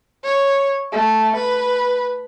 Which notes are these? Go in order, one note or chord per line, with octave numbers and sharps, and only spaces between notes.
C#5
A3
B4